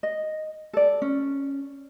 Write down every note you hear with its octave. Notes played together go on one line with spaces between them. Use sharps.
D#5
A4 D5
C#4